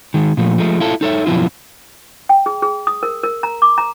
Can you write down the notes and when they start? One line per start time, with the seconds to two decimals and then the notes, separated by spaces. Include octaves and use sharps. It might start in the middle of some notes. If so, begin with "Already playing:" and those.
0.14 D#3 G#3
0.37 A#2 F3 A3
0.58 F3 G#3 A3
0.80 E4 F4 A4
1.01 D#4 A4 C#5 E5
1.26 F#2 B2 F3 E4 F4
2.29 G5
2.46 G#4
2.62 G#4
2.87 D#6
3.03 A#4
3.23 A#4
3.43 A#5
3.62 D6
3.78 A#5